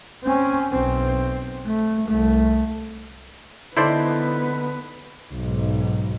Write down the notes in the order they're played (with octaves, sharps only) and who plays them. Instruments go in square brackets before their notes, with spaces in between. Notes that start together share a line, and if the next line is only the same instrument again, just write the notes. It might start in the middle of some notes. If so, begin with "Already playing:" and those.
[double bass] C4 C#4
B1 C4
A3
C2 A3
[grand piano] D3 D#4 A4 [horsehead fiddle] B3 B4 [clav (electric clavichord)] E4 C5 D5
[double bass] B1 G#2